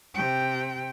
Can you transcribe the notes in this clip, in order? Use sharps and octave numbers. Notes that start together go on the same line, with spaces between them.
C3 G5